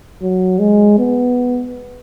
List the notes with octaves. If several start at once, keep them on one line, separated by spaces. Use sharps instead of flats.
F#3
G#3
B3